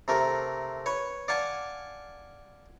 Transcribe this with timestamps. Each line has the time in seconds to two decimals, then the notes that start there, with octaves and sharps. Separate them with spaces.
0.08 C3 A3 A#4
0.86 B4 C#5
1.28 D5 F5 F#5 G#5 A5